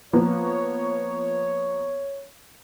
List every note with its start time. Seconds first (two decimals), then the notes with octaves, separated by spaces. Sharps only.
0.13 F3 A#3 B3 C#5